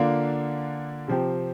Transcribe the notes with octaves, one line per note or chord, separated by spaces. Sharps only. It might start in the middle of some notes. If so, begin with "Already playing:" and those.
Already playing: D3 A#3 D4 F4
C3 F3 C4 G4